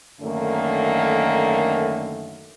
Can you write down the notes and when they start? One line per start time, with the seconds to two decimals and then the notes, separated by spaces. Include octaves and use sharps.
0.21 F#2 D3 D#3 A3 A#3